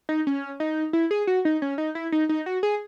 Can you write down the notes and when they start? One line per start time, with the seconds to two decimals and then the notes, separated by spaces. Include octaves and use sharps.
0.09 D#4
0.27 C#4
0.60 D#4
0.93 E4
1.11 G#4
1.27 F#4
1.45 D#4
1.62 C#4
1.78 D#4
1.95 E4
2.12 D#4
2.29 D#4
2.46 F#4
2.63 G#4